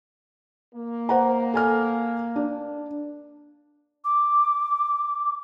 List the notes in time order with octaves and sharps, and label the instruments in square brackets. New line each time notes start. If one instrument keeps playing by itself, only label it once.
[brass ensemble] A#3
[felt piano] C5 F#5 A#5
A4 G#5 F6
D4
[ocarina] D6